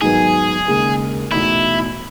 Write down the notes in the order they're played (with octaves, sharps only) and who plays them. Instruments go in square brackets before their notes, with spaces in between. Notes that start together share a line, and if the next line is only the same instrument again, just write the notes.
[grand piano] G#2 D#3 F#3 B3 D#4 [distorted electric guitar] G#4
[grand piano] D#2 C#3 G#3
[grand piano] E2 B2 A3 D#4 F#4 [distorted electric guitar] E4